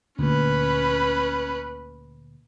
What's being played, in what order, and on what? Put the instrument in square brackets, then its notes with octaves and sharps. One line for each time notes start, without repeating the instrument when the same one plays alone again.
[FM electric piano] D2 A#2 [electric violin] C#4 B4